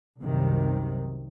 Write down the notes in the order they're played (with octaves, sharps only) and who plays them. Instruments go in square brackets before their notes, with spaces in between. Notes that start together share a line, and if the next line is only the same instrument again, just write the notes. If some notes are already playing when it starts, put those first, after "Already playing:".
[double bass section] C2 F#2 C3 D#3